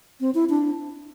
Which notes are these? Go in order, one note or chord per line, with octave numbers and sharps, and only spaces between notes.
C4
E4
D4